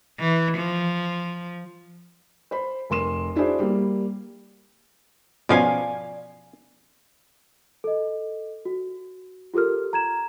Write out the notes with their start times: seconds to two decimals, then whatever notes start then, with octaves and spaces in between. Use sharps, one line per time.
0.20 E3
0.58 F3
2.51 C5 B5
2.90 F1 A#4 C6 E7
3.35 D4 E4 F#4 G#4 C5 D5
3.60 G3 A#3
5.49 B2 F3 C#4 D5 F5 G#5
7.84 A4 D#5
8.65 F#4
9.54 F4 G4 A4 A#4 F6
9.93 A#5 G#6 E7